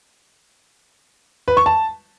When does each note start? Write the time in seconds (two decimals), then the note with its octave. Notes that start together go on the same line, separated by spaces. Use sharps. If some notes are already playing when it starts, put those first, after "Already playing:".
1.48 B4
1.57 C#6
1.66 A5